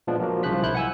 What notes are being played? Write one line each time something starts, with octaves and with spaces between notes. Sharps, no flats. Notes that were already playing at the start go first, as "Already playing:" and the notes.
A#2 F3 G#3 B3 D4
F3 F#3 A#3
C2 C#3 F3 C5 F#6 B6
B1 E4 F#6 G6
F#5 G#5 E6